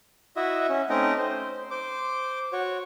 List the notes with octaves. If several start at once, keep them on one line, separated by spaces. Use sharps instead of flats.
E4 F#4 D#5 E5
C#4
A3 C4 C#4 D#4 D#5 G5
C5
C5 D6
F#4 C#5